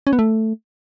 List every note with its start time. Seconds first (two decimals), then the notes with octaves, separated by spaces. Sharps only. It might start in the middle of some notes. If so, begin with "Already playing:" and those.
0.07 C#4
0.13 B3
0.19 A3